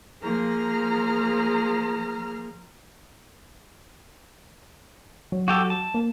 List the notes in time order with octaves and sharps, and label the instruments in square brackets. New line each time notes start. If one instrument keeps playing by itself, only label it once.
[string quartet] F3 A#3 G#4 A#5 F6
[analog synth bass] F#3
[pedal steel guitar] F#4 G4 A4
A5
[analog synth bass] A#3